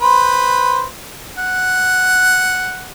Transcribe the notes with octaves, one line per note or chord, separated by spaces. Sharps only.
B4 C5
F#5